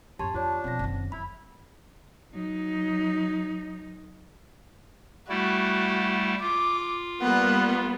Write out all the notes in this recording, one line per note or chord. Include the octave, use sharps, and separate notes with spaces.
A1 F#2 G4 C#5 A5 C6
F2 D4 F4 C#5
B2 F3 C4 A#6
F#1 D#3
F#2 E4 B5
F#3 D#4
G3 A3 E4 F#4
F4 D6
G3 A#3 B3 F#5